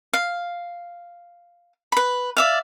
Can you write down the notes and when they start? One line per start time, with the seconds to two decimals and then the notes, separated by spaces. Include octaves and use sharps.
0.13 F5
1.92 B4 B5
2.37 D5 E5 F5